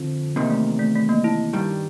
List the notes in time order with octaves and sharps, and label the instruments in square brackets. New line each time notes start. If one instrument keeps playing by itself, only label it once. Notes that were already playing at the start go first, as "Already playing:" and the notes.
Already playing: [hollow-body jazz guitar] F2 D3 F3 A3 C4
[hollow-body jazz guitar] E2 C3 D#3 [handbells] A#3
[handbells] A3
A3
A3
A#3
E4
[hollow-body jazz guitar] G2 D#3 G3